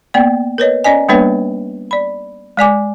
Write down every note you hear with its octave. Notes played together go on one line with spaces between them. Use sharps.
A#3 B3 D5
A#4 B4 C#5 D#5
C#4 D5 D#5 G#5
G3 A#3 B3 D4 B4 C#5
D5 B5
G#3 D5 G#5 D6